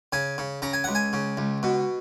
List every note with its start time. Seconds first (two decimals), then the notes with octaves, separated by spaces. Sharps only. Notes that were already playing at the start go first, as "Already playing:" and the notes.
0.13 C#3 G#5
0.38 C#3
0.62 C#3 A#5
0.73 G#5
0.84 C#2 F#5
0.95 G#5
1.13 C#3
1.37 C#2
1.63 B2